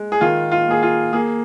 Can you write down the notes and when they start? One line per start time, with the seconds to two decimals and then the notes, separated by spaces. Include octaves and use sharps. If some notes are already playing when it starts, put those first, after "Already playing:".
Already playing: G#3
0.12 G#4
0.21 D#3 F4
0.51 F4
0.68 A#3 G#4
0.83 F4
1.13 A#3 G#4